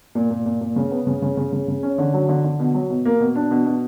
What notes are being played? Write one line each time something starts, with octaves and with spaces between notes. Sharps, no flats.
A#2
A#2
A#2
A#2
C#3
B3
C#3
C#3
C#3
C#3
C#3
C#4
D3
F#3
D3
D3
B2
F#3
B2
A#3
B2
D4
B2
B2